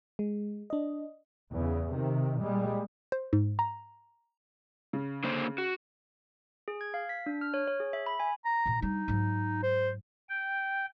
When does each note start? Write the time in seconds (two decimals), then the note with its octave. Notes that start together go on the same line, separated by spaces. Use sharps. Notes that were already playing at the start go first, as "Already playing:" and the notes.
0.19 G#3
0.70 D4 D#5
1.51 E2 C#3
1.91 C3 D#3
2.40 A#2 G3 G#3
3.12 C5
3.33 G#2
3.59 A#5
4.93 C#3
5.24 D3 A#3 C5
5.58 F#4
6.68 G#4
6.81 G#6
6.94 F5
7.09 B6
7.26 D4
7.41 F6
7.54 C#5
7.68 C#5
7.80 G#4
7.93 E5
8.06 B5
8.20 G#5
8.45 A#5
8.66 A#2 D#3
8.82 G3 D4 D#4
9.08 G#2 F#3
9.63 C5
10.29 G5